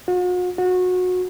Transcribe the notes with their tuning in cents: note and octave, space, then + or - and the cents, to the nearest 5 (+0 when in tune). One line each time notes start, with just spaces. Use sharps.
F#4 -45
F#4 -25